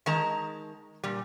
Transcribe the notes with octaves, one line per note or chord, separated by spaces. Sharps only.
D#3 G#3 A5 A#5
A#2 G3